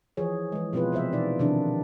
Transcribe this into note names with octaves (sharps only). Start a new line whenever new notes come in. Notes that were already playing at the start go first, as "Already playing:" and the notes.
E3 F3 G#4 C#5
E3 G#3
B2 F3 C4 F4 B4
C3 F3 C5 E5
B2 E3 D#4 D5
C3 D#3 F3 D4